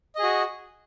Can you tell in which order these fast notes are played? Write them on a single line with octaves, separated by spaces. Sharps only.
D#5 G#4 F#4